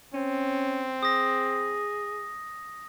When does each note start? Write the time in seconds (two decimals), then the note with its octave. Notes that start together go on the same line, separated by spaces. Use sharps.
0.14 C4 C#4
1.03 G#4 D#6 A#6